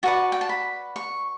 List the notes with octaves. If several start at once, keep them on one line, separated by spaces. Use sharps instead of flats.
F#4 B4 D5 A5
G5
A5
B5
C#6